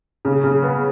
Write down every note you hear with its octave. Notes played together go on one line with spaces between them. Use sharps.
C#3
C#3
B3